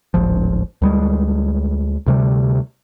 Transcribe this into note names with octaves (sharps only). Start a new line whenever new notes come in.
D1 G#1 F3
D2 G3 G#3
D2 C3 G3